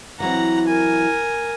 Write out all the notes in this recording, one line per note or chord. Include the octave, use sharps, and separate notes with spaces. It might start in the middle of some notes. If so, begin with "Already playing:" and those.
E3 F#3 C4 F#5 A#5
A#4 G#5